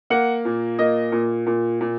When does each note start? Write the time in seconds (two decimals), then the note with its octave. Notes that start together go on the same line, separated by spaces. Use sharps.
0.10 A#3 F#5
0.45 A#2
0.79 A#3 D#5
1.12 A#2
1.46 A#2
1.81 A#2